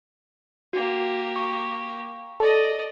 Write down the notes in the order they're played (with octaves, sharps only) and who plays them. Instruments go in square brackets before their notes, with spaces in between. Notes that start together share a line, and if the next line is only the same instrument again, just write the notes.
[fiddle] A#3 G4 [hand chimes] F#4
[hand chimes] C#6
[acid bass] A4 [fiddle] D5 D#5